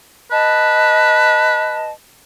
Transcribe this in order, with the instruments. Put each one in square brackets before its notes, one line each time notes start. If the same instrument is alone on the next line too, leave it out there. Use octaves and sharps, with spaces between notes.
[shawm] B4 [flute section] D#5 A5